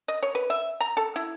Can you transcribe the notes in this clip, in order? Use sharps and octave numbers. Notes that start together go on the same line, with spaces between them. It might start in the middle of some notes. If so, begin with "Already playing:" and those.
D#5
C#5
B4
E5
A#5
A4
E4